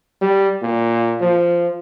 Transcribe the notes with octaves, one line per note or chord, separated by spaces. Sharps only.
G3
A#2
F3